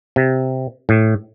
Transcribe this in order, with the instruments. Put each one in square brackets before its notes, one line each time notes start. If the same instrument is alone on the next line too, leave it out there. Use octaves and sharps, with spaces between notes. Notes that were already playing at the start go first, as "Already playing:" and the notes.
[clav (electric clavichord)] C3
A2